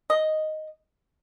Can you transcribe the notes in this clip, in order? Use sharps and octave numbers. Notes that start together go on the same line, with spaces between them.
D#5